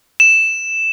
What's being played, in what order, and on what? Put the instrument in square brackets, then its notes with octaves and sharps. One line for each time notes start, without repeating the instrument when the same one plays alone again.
[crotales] E7